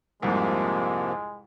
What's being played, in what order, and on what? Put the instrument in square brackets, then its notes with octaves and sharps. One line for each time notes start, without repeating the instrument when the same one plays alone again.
[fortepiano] C2 F2 G#2 [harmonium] C3 F3 A#3 [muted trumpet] G#3